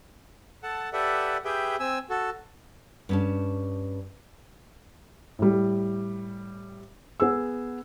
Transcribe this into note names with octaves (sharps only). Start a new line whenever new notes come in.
A4 F#5 A5
G4 A4 B4 D5 E5 F#5
G4 G#4 B4 E5 G5
C4 G#5 E6
F#4 A4
G2 C#4 A5
A2 G3
B3 G#4 E6